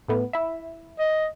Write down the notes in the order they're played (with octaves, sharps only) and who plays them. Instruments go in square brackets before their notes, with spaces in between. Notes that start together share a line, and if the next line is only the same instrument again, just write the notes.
[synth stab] A2 A3 B3
E4 E5
[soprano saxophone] D#5